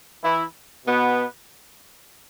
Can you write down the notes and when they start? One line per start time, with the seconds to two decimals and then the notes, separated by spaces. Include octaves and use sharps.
0.23 E3 E4
0.86 B2 B3